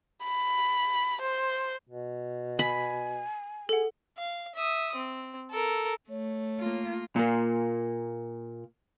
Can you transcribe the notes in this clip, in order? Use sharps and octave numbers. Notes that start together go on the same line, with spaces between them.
B5
C5
B2
G#5 B5
G#4 A4 F#5
F5
E5 D#6
C4
A4 A#4
A3 C#5
A#3 F4
A#2 A#3